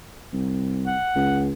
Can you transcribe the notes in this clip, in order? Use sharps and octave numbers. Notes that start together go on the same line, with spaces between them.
C2
F#5
C#2